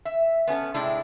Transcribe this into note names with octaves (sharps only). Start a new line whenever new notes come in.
E5
B3 C#4 G4 A4
A2 C3 G#3 C4 D4 E4